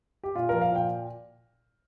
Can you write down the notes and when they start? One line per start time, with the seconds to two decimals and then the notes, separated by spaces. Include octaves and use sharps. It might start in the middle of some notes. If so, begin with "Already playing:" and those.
0.24 G4
0.36 A#2 F4
0.49 F3 A#4
0.61 F5
0.71 A#2 G5